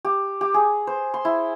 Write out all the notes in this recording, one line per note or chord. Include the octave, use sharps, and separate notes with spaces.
G4
G4
G#4
C5
C6
E4